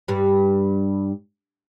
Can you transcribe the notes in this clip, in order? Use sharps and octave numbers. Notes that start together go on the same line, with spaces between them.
G2 G3